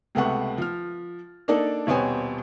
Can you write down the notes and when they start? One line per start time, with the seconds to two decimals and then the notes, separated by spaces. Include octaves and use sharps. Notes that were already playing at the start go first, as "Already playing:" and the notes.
0.15 C#2 C3 A3 B3 F#5 C#6
0.58 F3 F6
1.48 A#3 D4 D#4 A4 D5
1.87 D#1 B2 B3 C4 C#5 G#5